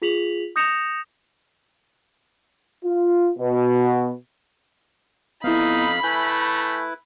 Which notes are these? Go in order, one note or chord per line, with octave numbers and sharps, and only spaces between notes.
F4 G#4 B6 F7 F#7
D#6 G6 A#6 C#7 E7 F7
F4
B2
F2 B3 D#4 E4 F5 B5
A3 E4 B4 G#5 G6